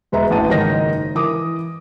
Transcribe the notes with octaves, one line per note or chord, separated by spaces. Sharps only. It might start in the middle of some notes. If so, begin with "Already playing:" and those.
E1 G#3 B4 E5 A#5
A1 F#5 A5 D#7
F#1 G#2 D#3 D#4 C#5 A#6
E3 A#4 D6 D#6